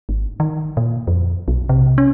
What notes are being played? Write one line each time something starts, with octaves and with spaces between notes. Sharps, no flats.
G#1
D#3
A#2
F2
B1
C3
C#4